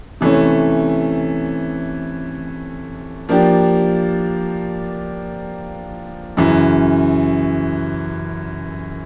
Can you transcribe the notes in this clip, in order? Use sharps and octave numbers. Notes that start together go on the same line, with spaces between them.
C3 E3 A3 C#4
F3 A#3 D4 G4
F#2 C#3 E3